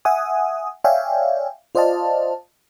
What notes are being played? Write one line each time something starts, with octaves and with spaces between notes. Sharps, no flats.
E5 F#5 G#5 D#6
C#5 D5 E5 F5 G5 G#5
F4 C5 D5 D#5 F5 A5